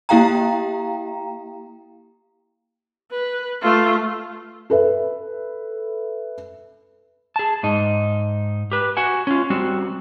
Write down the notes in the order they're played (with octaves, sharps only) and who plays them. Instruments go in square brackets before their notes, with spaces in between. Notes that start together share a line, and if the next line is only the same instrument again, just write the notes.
[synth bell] A#3 E4 G4 F5 G5 A#5
[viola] B4
A3 F4
[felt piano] A4 B4 E5
[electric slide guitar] G#4 A5
G#2 D#4
G4 B4
F#4 F#5 G#5
C#4 F4
G3 C4 F#4